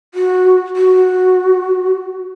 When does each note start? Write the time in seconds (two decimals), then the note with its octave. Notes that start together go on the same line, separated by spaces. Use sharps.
0.14 F#4
0.76 F#4